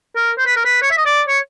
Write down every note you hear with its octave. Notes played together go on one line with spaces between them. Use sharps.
A#4
C5
B4
A#4
B4
C#5
E5
D#5
D5
C#5